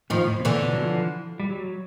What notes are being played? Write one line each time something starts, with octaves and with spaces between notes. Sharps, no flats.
A2 D#3 F3
A2
B2
A#2 D3 E3
B2
F#3
F3
G3
F#3